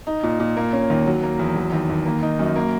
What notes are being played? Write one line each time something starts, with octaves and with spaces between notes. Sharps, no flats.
D#4
A#2
A#2
A#3
C#4
D#2
F#3
A#3
E2
F#3
D#2
D#2
A#3
D#4
F#2
A#3